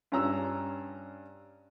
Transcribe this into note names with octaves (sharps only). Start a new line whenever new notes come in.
G2 C#4 A#5 E6